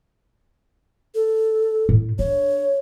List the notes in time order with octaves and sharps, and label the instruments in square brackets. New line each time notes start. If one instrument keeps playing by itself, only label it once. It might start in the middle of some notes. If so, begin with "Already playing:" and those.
[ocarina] A4
[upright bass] A2
[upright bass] D4 [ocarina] C#5